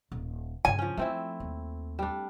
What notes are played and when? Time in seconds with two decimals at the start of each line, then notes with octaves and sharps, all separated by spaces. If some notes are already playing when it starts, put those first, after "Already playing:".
0.12 D#1
0.65 G2 C#3 G#5
0.79 F3 C#4
0.97 F3 A3 C4 E4
1.40 D#2
1.99 G3 D4